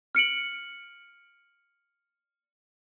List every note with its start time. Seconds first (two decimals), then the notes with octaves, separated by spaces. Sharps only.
0.15 F6 C#7 D7 F#7